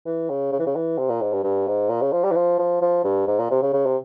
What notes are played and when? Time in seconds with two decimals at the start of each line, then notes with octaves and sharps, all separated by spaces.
0.06 E3
0.30 C#3
0.52 C#3
0.59 E3
0.66 C#3
0.75 E3
0.98 C3
1.09 A#2
1.21 G#2
1.32 G2
1.44 G2
1.67 G#2
1.89 A#2
2.01 C#3
2.12 F3
2.24 G3
2.31 E3
2.36 F3
2.59 F3
2.81 F3
3.04 G2
3.27 G#2
3.39 A#2
3.51 C3
3.62 C#3
3.73 C#3
3.86 C3